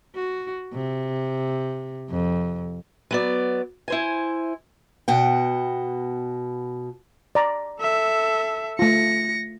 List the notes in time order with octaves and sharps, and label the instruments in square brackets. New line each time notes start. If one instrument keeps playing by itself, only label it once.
[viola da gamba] F#4
C3
F2
[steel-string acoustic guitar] F#3 B3 D5
E4 C5 G#5
B2 F#5 G5
[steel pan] D5 A#5
[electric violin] A4 E5
[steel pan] A3 F4 [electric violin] A#6 C#7